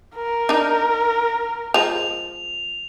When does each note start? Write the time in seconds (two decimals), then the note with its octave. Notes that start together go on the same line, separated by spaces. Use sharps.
0.16 A#4
0.49 D4 D#4
1.74 F3 G#3 F7